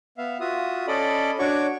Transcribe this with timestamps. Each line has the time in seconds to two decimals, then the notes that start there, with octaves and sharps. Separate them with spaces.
0.18 B3 E5 F5
0.40 F4 F#4 E5 D#6
0.87 C#4 A4 D5 D#5 B5
1.39 D4 F#4 C#5 C#6 D6